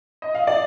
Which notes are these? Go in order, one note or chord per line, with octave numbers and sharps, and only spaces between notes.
D#5
F5
D5